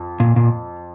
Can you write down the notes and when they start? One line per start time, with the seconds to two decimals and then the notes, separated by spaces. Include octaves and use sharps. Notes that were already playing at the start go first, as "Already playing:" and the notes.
Already playing: F2
0.20 A#2
0.36 A#2